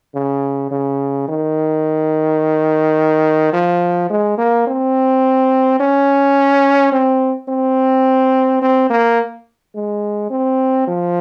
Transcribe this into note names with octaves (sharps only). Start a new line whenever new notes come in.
C#3
C#3
D#3
F3
G#3
A#3
C4
C#4
C4
C4
C4
A#3
G#3
C4
F3